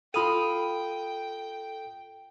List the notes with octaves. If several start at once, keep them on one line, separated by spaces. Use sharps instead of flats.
F4 A4 F5 G5 B5 C6 D#6 D#7